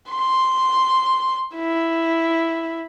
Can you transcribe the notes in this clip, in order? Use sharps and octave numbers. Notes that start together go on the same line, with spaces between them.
C6
E4